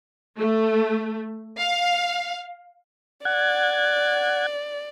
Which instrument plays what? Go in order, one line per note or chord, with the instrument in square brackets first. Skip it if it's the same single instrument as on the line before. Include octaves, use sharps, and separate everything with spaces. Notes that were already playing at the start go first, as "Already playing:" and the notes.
[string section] A3
F5
[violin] D5 [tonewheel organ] F#5 G#6